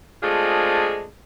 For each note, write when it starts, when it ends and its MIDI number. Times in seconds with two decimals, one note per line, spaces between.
0.23 1.05 56
0.23 1.05 57
0.23 1.05 60
0.23 1.05 62
0.23 1.05 65
0.23 1.05 68